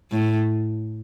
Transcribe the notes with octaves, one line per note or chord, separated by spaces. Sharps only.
A2